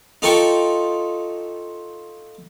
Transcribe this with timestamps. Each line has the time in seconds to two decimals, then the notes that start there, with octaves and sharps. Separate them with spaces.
0.22 D#4 F4 A4 G5 C#6